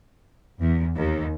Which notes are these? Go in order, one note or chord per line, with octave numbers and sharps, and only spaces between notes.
E2
D#2